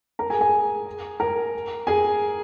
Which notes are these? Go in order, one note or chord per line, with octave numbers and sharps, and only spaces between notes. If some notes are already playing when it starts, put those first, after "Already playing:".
A#4 A#5
G#4 G#5
G#4 G#5
A#4 A#5
G#4 G#5